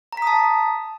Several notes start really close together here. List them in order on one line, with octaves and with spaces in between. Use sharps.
A#5 B6 D#6 A5